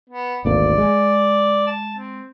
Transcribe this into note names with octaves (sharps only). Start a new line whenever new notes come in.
B3
G#1 D2 A#3 D5
G#3
A5
C4